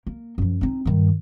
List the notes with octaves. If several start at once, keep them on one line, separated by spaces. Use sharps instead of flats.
A#3
F#2 F3
C4 D#4
G2 D#3